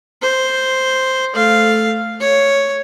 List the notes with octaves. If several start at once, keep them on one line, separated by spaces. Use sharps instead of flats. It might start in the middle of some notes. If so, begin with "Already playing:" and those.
C5
A3 F5
C#5